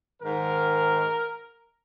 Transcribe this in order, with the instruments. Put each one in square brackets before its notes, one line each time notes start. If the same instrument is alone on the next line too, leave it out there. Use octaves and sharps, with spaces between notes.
[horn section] G#2 D#3 A#4